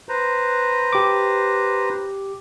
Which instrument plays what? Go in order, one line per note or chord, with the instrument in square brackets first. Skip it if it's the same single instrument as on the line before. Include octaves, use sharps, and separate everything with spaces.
[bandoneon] B4 C5 A#5
[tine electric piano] G4 D6